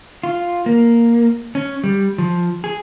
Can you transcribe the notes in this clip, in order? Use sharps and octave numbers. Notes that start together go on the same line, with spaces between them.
F4
A#3
C#4
G3
F3
G#4